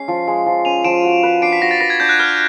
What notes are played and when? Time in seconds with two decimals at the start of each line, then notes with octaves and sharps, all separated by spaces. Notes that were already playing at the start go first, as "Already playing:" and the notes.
Already playing: G#3 C#4 C7
0.08 F3
0.27 G#3
0.46 F3
0.65 C#4 D#7 F7
0.84 F3 D7 E7
1.04 F#4
1.23 B4
1.42 D4 C7 D7
1.53 B6
1.61 F#4 A#6
1.71 A6
1.81 B4 A#6
1.90 G#6
2.00 D4 G6
2.09 F#6
2.19 B4 F6